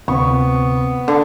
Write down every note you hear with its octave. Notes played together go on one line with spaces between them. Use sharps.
D2 C3 B3 C4 C#6
D3